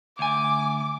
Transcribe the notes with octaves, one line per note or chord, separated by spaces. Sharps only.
D2 G#5 D6